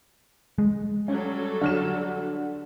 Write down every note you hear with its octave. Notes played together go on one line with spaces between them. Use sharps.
G#3
F#3 G3 C#4 A4
D3 F6 E7